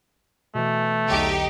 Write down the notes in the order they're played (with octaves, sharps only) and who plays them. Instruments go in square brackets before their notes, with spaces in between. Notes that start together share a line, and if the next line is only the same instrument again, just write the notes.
[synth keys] B2 E3 [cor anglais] A3
[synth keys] B1 E2 D3 [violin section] D#4 G4